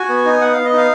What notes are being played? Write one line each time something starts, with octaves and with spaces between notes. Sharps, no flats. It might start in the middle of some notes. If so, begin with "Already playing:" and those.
Already playing: F#4 G#5
B3
D#4
B3 F#5
B3 F5
D#5
D#4 F5